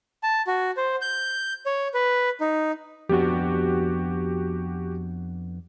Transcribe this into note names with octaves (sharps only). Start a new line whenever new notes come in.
A5
F#4
C5
G6
C#5
B4
D#4
F2 B3 D4 F#4 G4